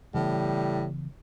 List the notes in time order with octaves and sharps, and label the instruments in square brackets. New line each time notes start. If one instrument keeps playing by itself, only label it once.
[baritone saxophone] A2 [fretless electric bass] C#3 E3 B3 [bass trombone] G3